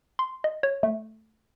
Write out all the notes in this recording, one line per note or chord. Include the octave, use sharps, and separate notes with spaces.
C6
D#5
C#5
A3